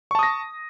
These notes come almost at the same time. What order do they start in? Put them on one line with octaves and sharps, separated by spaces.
C#6 A5 D#6 A#6